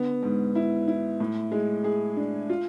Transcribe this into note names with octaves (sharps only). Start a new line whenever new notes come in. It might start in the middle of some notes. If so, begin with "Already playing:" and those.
Already playing: D3 B3
G#2
E4
E4
A2
G#3
G#4
D4
F4